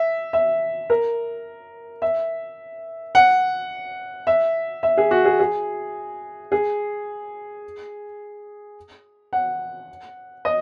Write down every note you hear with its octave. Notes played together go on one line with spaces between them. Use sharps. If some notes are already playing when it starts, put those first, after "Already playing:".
Already playing: E5
E5
A#4
E5
F#5
E5
E5
G#4
F#4
G#4
G#4
G#4
F#5
D#5